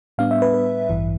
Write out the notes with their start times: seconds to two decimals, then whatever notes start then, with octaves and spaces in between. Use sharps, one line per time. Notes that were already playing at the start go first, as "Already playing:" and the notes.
0.18 A2 G3 B3 D4 F5
0.31 E5
0.42 B4
0.54 B4
0.90 A1 G2 E3